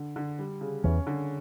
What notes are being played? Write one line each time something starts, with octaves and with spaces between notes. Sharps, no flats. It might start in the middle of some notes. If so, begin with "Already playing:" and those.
Already playing: D3
D3
G3
C#3
E2 E3 C#4
D3